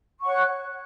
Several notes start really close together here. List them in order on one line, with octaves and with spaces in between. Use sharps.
C#6 F#5 C#5 F#6